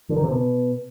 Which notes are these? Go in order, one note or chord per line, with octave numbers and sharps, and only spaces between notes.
D3
D#3
C3
B2